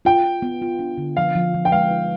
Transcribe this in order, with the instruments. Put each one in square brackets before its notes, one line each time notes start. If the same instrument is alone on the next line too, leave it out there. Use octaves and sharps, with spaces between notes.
[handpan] F4 [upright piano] G5
[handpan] F4
B3
F4
D4
D3
[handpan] F3 [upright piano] F5
[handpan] F3
F3
[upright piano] G5
[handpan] G#3 [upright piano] F5
[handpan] D#4